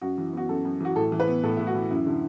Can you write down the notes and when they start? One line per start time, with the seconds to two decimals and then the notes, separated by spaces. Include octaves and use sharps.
0.01 F#2 F#4
0.18 E3
0.33 B3 F#4
0.49 F#2 A4
0.65 F#2
0.80 E3 F#4
0.96 A2 A4
1.12 E3
1.20 B4
1.28 B3
1.43 A2 A4
1.57 A2 E4
1.67 F#4
1.75 E3
1.91 F#2 E4
2.06 D3